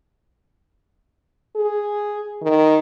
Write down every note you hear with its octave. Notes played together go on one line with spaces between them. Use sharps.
G#4
D#3